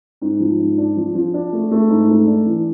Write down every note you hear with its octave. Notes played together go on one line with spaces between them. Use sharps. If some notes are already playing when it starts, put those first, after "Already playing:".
G#2
F3
G#2
D4
F3
F3
D4
A3
A3
G#2
A3
D4
E3